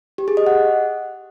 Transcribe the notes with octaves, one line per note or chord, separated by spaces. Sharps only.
G4
G#4
D#5
F#5